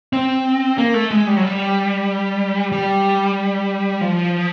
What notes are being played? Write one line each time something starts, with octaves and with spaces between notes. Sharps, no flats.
C4
A#3
A3
G#3
G3
F#3
G3
G3
F3